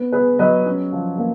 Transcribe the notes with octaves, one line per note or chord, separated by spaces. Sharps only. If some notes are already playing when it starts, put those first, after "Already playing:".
Already playing: B3
B3 G#4 B4
F#3 B4 D#5
C#4
F3
A#3